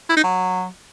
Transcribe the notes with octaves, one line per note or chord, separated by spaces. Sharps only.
E4
D#4
F#3